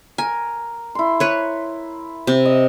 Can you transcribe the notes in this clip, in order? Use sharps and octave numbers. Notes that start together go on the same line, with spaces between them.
A#4 G#5
E4 C6
B4 C#5
C3
D#5